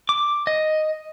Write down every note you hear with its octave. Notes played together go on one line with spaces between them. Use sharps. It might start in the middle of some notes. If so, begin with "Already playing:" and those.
D6
D#5